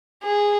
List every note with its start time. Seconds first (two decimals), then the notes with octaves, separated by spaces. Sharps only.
0.23 G#4